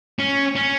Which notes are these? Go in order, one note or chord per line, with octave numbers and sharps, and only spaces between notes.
C#4
C#4